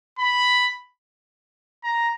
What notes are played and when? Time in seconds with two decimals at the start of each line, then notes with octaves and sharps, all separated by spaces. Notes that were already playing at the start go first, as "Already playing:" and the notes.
0.19 B5
1.84 A#5